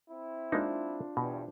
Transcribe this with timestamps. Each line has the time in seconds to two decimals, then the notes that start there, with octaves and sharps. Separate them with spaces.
0.10 C4 E4
0.52 G#3 A#3 D4 D#4 F4 C5
1.17 E2 G2 B2